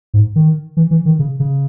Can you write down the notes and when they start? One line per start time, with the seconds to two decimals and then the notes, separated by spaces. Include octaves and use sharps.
0.14 G#2
0.36 D#3
0.77 E3
0.91 E3
1.05 D#3
1.19 C#3
1.40 C#3